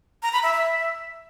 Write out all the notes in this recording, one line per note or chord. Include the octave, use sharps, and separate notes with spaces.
A#5
B5
E5
E5